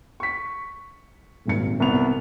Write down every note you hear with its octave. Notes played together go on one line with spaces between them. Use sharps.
C#6 B6
D#1 G#1 C#7
C2 B3 F7